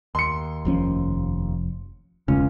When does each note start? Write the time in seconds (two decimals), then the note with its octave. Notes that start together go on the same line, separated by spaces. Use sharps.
0.15 D#2 C6 C#7
0.65 F1 F3 C#4
2.28 E1 C#2 C#4